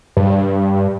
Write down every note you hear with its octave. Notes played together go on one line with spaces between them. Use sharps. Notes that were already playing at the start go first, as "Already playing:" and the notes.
G2